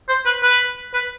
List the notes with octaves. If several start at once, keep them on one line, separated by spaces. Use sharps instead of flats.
C5
B4
B4
B4